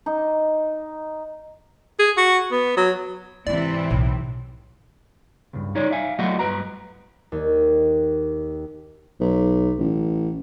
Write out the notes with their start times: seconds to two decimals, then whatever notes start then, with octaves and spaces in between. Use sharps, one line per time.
0.06 D#4
1.99 G#4
2.17 F#4
2.51 B3
2.77 F#3
3.47 G#2 C3 E3 C4 D5
3.91 B1 A2
5.53 C#2 G2
5.75 G3 D#4 C#5 D5
5.91 E5 F5 G#5
6.19 F#3 A3 F#4 G4 D#5 F#5
6.39 G2 C#3 B4 A#5
7.32 D#2
9.20 B1
9.79 A1